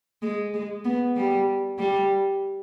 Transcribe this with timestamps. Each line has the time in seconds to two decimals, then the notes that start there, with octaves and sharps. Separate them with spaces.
0.22 G#3
0.54 G#3
0.84 B3
1.16 G3
1.79 G3